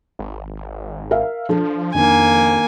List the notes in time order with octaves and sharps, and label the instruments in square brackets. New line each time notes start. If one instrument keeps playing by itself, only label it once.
[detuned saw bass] G#1
[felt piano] A#4 E5 F5
[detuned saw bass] F3 [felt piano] D4 A4
[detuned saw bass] F2 [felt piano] D#3 D4 [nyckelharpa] A#3 G#5